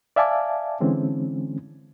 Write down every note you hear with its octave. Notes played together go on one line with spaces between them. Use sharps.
D5 E5 F5 G#5 A5 D6
D3 E3 G#3 C4 C#4